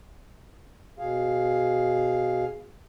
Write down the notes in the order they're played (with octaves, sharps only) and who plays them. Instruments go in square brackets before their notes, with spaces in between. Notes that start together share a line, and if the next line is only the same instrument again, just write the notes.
[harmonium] B2 G#4 F5